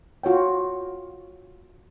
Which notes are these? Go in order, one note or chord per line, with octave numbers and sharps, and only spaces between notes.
F4 F#4 C#5 G5